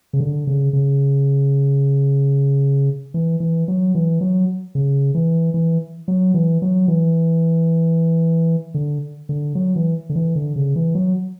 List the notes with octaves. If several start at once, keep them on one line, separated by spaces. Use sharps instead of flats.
C#3
D3
C#3
C#3
E3
E3
F#3
E3
F#3
C#3
E3
E3
F#3
E3
F#3
E3
D3
D3
F#3
E3
D3
E3
D3
C#3
E3
F#3